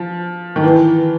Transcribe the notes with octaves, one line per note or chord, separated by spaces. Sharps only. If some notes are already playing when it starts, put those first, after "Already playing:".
Already playing: F3
D#3
E3